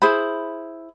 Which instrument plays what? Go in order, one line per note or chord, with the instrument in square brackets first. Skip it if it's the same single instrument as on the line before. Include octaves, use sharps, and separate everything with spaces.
[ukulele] E4 G#4 C5 B5